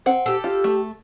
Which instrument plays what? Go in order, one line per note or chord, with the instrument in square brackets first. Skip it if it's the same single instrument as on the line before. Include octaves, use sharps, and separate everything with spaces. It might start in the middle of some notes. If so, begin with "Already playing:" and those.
[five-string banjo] C4 F#5
[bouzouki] G4 A4
[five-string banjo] F4
A3